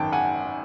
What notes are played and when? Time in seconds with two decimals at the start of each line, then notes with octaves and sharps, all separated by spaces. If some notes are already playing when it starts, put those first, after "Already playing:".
Already playing: G#1 F#2 D#3 G5 A5
0.12 F#5 G#5